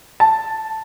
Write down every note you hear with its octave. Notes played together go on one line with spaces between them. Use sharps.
A5